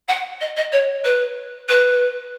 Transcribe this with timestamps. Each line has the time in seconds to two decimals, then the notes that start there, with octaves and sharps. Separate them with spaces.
0.08 F#5
0.40 D#5
0.56 D#5
0.72 C#5
1.04 B4
1.68 B4